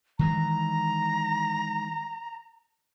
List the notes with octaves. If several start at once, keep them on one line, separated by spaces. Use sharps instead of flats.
D#3 E3 G#3 A#5